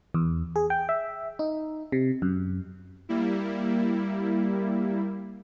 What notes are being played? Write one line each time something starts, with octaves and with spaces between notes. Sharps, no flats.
E2
G#4
G5
E5
D#4
C3
F#2
G3 A#3 E4